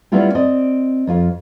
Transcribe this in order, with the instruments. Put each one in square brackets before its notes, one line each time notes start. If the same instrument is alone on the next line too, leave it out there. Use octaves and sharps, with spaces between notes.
[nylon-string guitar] G3 B3 C#4 E4 F4 G4
C4 D5 D#5
F2 F4